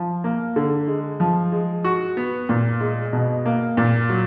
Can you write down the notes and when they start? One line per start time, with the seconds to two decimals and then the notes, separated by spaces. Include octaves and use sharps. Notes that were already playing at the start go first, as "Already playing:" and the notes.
Already playing: F3
0.24 A#3
0.56 D3
0.87 G#3
1.20 F3
1.52 G#3
1.84 F#4
2.17 B3
2.49 A#2
2.80 G#3
3.13 B2
3.46 A#3
3.77 A#2
4.09 F#3